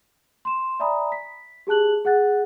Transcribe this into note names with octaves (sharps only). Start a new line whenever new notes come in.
C6 E7
D5 E5 G#5 A#5 B5 D#6
B6
G4 G#4 A5 F#6 F#7
G#4 F#5 F#6 A6